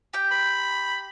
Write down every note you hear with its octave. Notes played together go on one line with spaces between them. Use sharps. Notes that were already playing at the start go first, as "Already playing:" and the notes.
G4 G5
B5